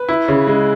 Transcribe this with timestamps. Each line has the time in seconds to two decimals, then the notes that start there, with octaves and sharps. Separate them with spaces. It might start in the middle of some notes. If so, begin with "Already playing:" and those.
Already playing: B4
0.09 E4
0.28 C#3
0.47 G#3